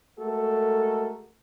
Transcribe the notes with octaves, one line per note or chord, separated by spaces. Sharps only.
G#3 A3 F#4 A4 A#4